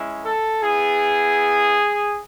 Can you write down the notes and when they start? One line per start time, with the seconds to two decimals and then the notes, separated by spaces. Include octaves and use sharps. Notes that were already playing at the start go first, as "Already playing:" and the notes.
Already playing: G#3 C#4 E4
0.24 A4
0.61 B3 E4 G#4